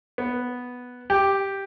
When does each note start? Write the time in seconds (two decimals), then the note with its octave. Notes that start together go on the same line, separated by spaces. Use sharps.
0.18 B3
1.10 G4